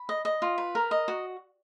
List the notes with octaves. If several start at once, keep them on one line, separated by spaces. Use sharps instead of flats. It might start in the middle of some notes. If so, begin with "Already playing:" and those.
Already playing: B5
D#5
D#5
F4
B4
A#4
D#5
F#4